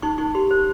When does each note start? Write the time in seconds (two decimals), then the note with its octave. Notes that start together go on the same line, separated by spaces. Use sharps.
0.02 D#4 C#6
0.18 D#4 C#6
0.35 G4 C6
0.51 C5